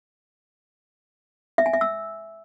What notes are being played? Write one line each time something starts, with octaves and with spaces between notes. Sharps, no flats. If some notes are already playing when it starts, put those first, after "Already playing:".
E5
G#5
E5
E6